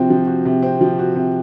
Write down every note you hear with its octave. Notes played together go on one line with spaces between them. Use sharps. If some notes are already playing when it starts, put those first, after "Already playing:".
Already playing: C3 F3 C4 F#4
F3
F#4
C3
C4
F3
F#4
C3